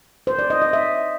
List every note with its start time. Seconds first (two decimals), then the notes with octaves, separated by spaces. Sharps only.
0.27 C5
0.39 D5
0.50 D#5
0.62 D#5
0.73 E5